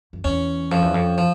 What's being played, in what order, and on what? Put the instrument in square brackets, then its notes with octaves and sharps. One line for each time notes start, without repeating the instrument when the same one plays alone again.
[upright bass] F2
[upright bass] E2 [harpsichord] C#4
[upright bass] F2 [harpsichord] F3
[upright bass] E2
F2
[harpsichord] F3